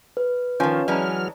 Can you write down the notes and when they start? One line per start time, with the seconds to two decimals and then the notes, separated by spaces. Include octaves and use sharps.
0.17 B4
0.60 D#3 F3 C#4 F4 C#5 G#5 A5
0.88 E3 F#3 G#3 C#4 D5 A5 A#5 F6